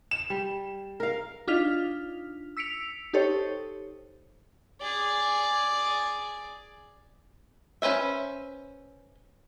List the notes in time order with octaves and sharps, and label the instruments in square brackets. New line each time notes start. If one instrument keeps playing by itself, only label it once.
[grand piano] E7
[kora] G3
A#4 F5
[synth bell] D4 D#4 F4 F6 B6 F7
E6 B6 C#7 D7 F7
D#4 G4 A4 C5 C#5
[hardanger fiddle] G#4 D5
[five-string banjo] C#4 B4 C5 E5